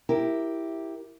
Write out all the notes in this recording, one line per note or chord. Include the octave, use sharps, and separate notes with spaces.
E4 G4 A#4